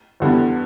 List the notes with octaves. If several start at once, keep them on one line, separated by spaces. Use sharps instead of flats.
E2 D3 G3 B3